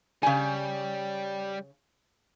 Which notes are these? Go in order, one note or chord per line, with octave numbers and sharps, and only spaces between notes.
C#3 G3 G#5